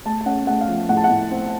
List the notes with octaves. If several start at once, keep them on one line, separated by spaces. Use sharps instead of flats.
A3 A5
A5
C#4 F#5
A3 F#5
F5
F3
A2 F#5
A5
F#5
A2
C4